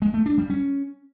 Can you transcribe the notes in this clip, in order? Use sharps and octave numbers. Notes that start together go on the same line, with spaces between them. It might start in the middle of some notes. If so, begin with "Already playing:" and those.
G#3
A3
D4
G3
C#4